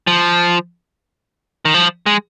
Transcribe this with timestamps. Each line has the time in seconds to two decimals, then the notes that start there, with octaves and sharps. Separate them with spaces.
0.07 F3
1.65 D#3
1.74 F3
2.06 G#3